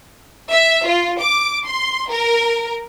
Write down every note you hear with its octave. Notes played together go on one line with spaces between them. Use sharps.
E5
F4
D6
C6
A#4